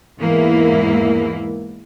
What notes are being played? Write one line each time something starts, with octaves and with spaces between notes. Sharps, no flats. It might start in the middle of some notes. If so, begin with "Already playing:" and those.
E2 G#2 E3 A#3 E4